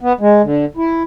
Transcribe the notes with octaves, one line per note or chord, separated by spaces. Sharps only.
B3
G#3
D3
E4